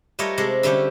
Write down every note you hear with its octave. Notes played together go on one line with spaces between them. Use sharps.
G3 A3 F4 A#4 C#5 D#5
C3 G#3 A4
D3 G3 A3 C#4 G4